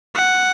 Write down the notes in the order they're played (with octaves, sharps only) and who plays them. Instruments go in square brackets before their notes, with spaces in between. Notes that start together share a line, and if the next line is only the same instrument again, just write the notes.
[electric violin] F#5